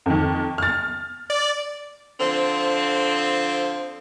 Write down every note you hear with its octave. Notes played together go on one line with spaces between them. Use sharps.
F2 D#3
F6 A6
D5
D3 F3 C4